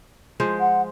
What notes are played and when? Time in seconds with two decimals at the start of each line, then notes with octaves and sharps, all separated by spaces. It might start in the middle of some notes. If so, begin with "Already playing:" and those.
0.40 F3 G#3 C5
0.59 F#5